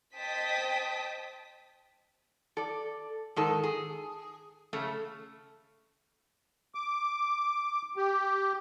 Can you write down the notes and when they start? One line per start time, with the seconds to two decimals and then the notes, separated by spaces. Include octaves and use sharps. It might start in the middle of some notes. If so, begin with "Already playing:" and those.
0.17 C5 D#5 G5 A5 D#6 B6
2.57 A4 D5
3.36 G#2 D#3 A4
3.64 G#4
4.73 C#3 A3
6.75 D6
7.97 G4